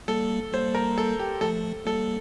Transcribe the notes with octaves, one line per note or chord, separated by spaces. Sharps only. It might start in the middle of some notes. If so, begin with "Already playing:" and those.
G3 A#3 A4
G3 A#3 C5
A#4
A4
G4
F3 A3 A4
G3 A#3 A4